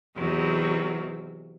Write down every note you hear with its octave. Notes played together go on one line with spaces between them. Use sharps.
E2 C3 D#3 F#3